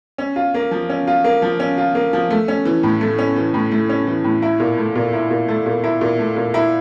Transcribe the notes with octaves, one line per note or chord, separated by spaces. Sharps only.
C#4
F4
A#3
F3
C#4
F4
A#3
F3
C#4
F4
A#3
F3
A3
C#4
E3
A2
A3
C#4
E3
A2
A3
C#4
E3
A2
E4
A#2
A3
A#2
E4
A#2
A3
A#2
E4
A#2
A3
A#2
E4